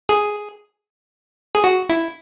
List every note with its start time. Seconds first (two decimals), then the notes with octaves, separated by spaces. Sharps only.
0.09 G#4
1.55 G#4
1.64 F#4
1.89 E4